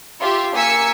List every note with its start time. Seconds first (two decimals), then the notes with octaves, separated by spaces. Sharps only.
0.19 F4 G4 E5
0.54 A#3 G#5 E6 B6 C#7